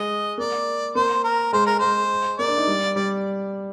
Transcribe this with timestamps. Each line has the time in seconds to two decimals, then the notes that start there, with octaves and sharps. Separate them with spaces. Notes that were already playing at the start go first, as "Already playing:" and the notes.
Already playing: G#3 D#5
0.38 A#3 D5
0.95 A#3 C5
1.24 A#4
1.53 G#3 C5
1.66 A#4
1.79 G#3 C5
2.39 A#3 D5
2.48 D4
2.58 D#4
2.67 G3
2.96 G3 D5